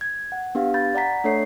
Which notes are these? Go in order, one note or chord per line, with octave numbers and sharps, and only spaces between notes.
G#6
F#5
B3 D4 G4 F5
B5 G6 A6
D5 F#5 A#5 B6
A3 D4 A4 C#5 E5 C7